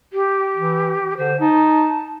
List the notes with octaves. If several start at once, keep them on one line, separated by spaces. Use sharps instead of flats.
G4
E3
D3 C5
D#4 A5